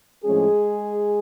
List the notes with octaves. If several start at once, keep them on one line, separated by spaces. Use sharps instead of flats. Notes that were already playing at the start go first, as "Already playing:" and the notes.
A2 F3 G#3 A3 C#4 G#4